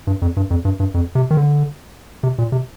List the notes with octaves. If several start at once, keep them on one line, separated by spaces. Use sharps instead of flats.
G2
F2
G2
F2
G2
G2
F2
C3
D#3
D3
C3
A#2
C3